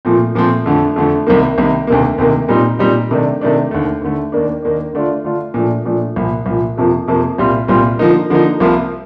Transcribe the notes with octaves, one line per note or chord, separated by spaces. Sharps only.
A#2 F3 A3 C4
A#2 F3 A3 C4
F2 D3 A3
F2 D3 A3
C2 C3 D#3 A#3
C2 C3 D#3 A#3
D2 C3 D#3 A#3
D2 C3 D#3 A#3
A#2 G3 C4 D#4
A#2 G3 C4 D#4
C3 D#3 A3 D4
C3 D#3 A3 D4
D#2 D3 A3
D#2 D3 A3
D#2 D#3 A#3 D4
D#2 D#3 A#3 D4
D3 A3 D4 F4
D3 A3 D4 F4
A#2 F3 A3 D4
A#2 F3 A3 D4
C2 A#2 F3
C2 A#2 F3
F2 C3 F3 A#3
F2 C3 F3 A#3
C2 A#2 G3 C4 F4
C2 A#2 G3 C4 F4
D3 F3 A#3 D#4
D3 F3 A#3 D#4
C2 C3 F3 A#3 F4